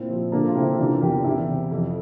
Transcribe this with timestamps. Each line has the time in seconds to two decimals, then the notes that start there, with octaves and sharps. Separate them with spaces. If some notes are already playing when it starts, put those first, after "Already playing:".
Already playing: A#2 C4 E4
0.09 F3
0.32 D2 A#3 D4
0.47 F4
0.55 C3 C4 E4
0.78 E3 D4 F4
1.01 E2 G4 A#4
1.24 E2 E4 G4
1.48 C3
1.71 F2